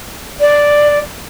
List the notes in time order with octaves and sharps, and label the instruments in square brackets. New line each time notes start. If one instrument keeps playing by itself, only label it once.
[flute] D5